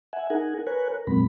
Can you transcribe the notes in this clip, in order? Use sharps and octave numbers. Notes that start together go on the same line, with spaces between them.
E5 F#5 G#5
D#4 G#4 A#4 F#5 G#5
A#4 B4 C#5 G#5 F#6
A#4
F2 A#2 F#3 G#3 C4 B5